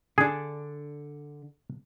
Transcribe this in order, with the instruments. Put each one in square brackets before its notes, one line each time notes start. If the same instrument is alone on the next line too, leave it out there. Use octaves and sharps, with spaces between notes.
[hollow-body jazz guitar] D3 D4 [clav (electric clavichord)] G#4